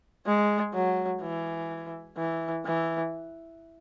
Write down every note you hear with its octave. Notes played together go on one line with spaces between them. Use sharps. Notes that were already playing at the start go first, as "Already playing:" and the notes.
G#3
F#3
E3
E3
E3